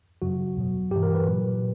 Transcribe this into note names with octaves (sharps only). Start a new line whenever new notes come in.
F#2 C#3 F#3 F#4
E2 B2 F#3
G2 E3 G4
A#4
B4
A#2 F#3